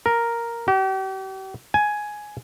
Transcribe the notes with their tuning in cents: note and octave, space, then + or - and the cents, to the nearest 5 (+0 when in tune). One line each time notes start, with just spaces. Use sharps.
A#4 +0
G4 -40
G#5 +10